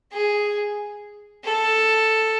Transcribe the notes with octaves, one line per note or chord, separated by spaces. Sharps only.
G#4
A4